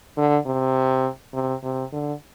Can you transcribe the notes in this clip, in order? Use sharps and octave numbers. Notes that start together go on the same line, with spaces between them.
D3
C3
C3
C3
D3